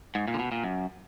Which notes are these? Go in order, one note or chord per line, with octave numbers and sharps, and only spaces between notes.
G#2
A#2
D3
B2
A#2
F#2